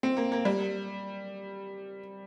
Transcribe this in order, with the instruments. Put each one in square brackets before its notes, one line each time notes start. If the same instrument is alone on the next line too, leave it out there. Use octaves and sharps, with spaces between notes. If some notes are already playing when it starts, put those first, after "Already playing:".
[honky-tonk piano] C4
A#3
A#3
G3